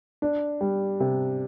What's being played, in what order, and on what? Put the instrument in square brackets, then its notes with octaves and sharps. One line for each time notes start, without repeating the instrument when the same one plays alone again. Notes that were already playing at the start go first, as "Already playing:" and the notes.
[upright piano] D4
G3
C3